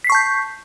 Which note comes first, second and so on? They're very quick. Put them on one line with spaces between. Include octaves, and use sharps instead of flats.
B6 C7 C#6 A5 G6